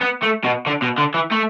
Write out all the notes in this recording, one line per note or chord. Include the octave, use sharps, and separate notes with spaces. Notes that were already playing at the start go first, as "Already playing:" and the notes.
B3
A3
B2
D3
B2
D3
E3
A3